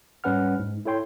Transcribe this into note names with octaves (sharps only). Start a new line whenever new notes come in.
G#2 G3 C#4 B4 F#5 F6
G#2
E4 A4 C#5 G5 C6